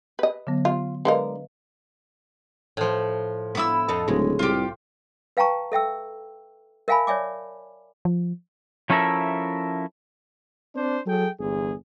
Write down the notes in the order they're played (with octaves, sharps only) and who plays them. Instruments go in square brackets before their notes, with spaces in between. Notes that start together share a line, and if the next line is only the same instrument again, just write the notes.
[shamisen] B4 D#5
[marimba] D3 F#3 B3
[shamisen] F4
[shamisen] D3 G#3 A#4 [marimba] B4 D#5 F5
[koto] A2 F3
[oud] B3 E4 [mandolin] B5 D6 E6
[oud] F2 A4 D#5
[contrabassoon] D1 [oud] C#3 G#3
[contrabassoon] C2 [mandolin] F4 G4
[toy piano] B4 F5 G5 A5 A#5 C#6
A4 E5 G5 E6
A#4 E5 F5 G#5 A5 B5
C#5 D5 E5 G#5 D6
[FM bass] F3
[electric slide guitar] F3 C#4 E4 A4 A#4 E5
[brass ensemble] C4 D4 C5
F#3 G#4 A4 G5
G1 E2 G#4